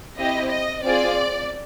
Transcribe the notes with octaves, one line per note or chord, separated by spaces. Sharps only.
C4 E4 G4 D#5
D#5
C4 F4 G#4 D5